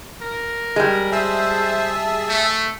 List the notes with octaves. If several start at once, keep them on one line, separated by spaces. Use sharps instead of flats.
A#4
G3 G#3
G#4 C5 E5 A5
A3